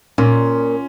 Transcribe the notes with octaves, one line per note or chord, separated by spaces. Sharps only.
A#2 C#4